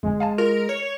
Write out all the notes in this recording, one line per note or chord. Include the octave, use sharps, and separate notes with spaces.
G1 F2 G#3
F5 G#5 A5
F4 A#4
C#5